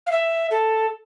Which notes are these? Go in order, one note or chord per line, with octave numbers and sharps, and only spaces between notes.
F5
E5
A4